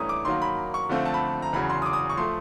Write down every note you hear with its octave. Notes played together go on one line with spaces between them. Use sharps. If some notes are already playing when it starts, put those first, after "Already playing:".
Already playing: G2 E3 A3 C#4 A#5 D#6
D6
D#3 F#3 A#3 C6
B5
C#6
D3 F3 A3 C4 F4
A5
B5
A#5
E2 C#3 F#3 B5
C6
D#6
D6
D#6
C#6
F3 A3 C6